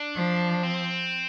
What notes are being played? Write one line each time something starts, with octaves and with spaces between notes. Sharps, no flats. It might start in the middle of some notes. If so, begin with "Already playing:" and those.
Already playing: D4
F3
C4